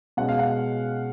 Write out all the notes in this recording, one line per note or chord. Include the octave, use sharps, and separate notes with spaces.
B2 G#3 C#4 F#5
F5
F#5